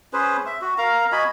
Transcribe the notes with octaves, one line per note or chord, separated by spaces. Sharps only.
C#4 G#4 B4 C5
E5
F#4
A#4 F5 A#5
F#4 D#5 G#5 B5